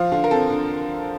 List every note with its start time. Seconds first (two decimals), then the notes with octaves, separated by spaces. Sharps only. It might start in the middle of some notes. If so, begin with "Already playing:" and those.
Already playing: F3 F4
0.12 D3 F4
0.24 A#4
0.31 C4 A4
0.50 D3